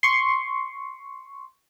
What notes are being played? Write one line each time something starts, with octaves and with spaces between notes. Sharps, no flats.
C6 C#6